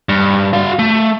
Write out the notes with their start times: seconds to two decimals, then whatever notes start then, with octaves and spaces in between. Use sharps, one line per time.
0.09 G2
0.53 F#4 F5
0.79 A3